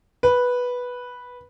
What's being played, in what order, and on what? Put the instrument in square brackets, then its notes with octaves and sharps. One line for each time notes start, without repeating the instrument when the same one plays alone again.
[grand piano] B4